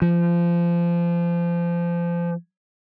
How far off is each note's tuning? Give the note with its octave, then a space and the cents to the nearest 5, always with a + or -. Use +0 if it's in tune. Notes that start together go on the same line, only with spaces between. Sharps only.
F3 -25